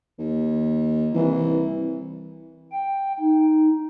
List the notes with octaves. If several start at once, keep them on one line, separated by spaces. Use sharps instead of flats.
D#2
C2 E3
G5
D#4